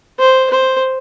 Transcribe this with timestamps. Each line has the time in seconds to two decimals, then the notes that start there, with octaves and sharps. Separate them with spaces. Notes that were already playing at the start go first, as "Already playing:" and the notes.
0.19 C5
0.50 C5